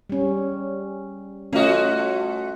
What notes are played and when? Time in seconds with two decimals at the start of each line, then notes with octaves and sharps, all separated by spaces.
0.10 G3 C#4
1.53 A3 C#4 F4 F#4 D#5